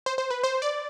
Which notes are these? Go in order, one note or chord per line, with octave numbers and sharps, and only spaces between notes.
C5
C5
B4
C5
D5